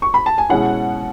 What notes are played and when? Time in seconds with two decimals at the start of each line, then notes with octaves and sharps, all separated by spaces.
0.02 C#6
0.14 B5
0.26 A5
0.38 G#5
0.49 B2 G#3 C#4 E4 F#5